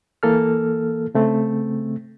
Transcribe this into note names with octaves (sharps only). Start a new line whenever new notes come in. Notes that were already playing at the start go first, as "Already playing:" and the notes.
E3 A#3 A4 F6
C#3 A3 C4